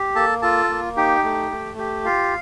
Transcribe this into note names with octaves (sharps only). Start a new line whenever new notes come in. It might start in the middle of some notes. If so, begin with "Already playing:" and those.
Already playing: G4
A#3 A4 A5
F4 A4 A5
A#3
D#4 G4 G5
A3
A3
G4
F4 F5